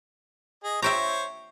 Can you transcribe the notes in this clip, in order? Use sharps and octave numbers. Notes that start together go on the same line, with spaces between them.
G#4 D#5
C5 C#5 E5 G5 A#5